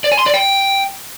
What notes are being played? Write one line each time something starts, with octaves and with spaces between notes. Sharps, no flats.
D5
G#5
C6
D5
G5